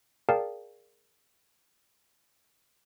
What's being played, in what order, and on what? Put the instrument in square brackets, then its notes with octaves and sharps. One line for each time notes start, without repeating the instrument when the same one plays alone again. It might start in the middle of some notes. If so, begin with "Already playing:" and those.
[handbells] G#4 A#4 D5 F5 G5 A5